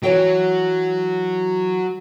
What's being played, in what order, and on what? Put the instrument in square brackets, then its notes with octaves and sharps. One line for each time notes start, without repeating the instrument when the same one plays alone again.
[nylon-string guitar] E3 C#5 G5 [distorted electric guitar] F#3